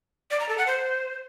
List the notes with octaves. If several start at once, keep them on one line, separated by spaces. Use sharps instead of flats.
D5
A#5
A4
F#5
C5